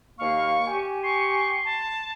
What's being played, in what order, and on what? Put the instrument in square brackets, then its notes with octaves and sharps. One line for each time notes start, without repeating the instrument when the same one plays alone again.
[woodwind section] D#2 A#3 F5 [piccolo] C#6
[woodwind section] G4 G#5
[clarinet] C6 [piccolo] C#6
[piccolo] A5